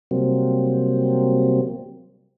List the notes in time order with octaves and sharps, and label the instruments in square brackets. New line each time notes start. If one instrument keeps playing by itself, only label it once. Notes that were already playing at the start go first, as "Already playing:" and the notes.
[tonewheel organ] C3 F#3 G3 A#3 C4